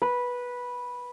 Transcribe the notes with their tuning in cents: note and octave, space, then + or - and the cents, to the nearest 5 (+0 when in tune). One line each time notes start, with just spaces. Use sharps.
B4 -10